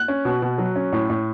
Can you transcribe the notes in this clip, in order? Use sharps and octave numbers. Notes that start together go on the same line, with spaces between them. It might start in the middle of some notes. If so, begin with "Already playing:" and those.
Already playing: F#6
C#4
B2
B2
F#3
C#4
A2
A2